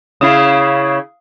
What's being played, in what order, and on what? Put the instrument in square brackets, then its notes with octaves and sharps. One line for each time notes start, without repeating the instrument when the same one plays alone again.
[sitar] C#3 E4 [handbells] F5 D#6